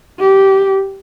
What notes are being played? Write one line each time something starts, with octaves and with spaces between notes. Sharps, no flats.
G4